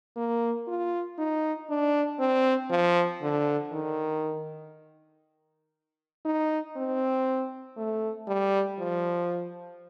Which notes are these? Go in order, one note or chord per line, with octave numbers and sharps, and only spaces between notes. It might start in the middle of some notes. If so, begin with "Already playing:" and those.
A#3
F4
D#4
D4
C4
F3
D3
D#3
D#4
C4
A3
G3
F3